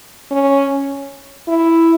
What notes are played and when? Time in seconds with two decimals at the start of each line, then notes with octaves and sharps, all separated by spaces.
0.31 C#4
1.48 E4